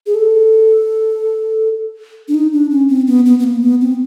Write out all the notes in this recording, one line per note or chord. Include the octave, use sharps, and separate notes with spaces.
G#4
A4
D4
D#4
D4
C#4
C4
B3
B3
B3
A#3
B3
C4